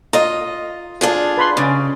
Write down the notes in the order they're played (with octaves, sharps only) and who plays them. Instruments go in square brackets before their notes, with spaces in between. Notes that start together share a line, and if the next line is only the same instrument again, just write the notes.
[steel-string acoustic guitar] F4 D#5 [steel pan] A#5
[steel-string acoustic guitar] D4 F4 G#4
[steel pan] B4 B5 C6
[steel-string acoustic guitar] C#3 [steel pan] C#4 D5